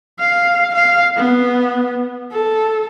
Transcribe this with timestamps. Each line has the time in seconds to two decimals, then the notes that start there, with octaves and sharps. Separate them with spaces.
0.20 F5
0.75 F5
1.16 B3
2.32 A4